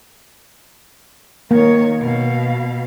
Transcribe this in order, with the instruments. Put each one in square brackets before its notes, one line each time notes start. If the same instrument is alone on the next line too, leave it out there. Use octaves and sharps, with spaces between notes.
[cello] D#3 C#5 [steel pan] A#3
[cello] B2 F5